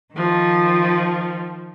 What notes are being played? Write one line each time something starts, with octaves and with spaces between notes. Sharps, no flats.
D#3 F3